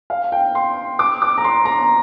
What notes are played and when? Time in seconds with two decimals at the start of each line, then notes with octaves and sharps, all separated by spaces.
0.10 F5
0.32 G5
0.55 C6
0.99 D6
1.22 D6
1.38 A#5
1.44 C6
1.65 A#5